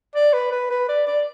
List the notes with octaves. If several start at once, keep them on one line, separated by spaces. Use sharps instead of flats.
D5
B4
B4
B4
D5
D5